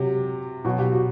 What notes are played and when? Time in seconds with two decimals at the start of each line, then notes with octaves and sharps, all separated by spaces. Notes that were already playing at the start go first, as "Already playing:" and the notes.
Already playing: C3 F#3 G4
0.65 B2 F#3 F#4
0.78 G4
0.92 F#4